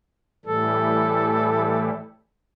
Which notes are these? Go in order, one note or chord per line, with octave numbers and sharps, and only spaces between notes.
A2 E3 G3 A4